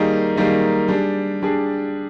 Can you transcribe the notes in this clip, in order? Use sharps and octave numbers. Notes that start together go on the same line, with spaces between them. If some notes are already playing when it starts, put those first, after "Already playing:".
Already playing: D#3 G3 A#3 D#4 G#4
D#3 G3 A#3 D#4 G#4
G3 D4 G#4
G3 D4 G#4